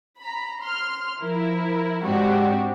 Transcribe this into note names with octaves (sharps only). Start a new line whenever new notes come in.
A#5 B5
C6 F6
F3 E4 A#4
G#2 G#3 C4 D4 F#4 G4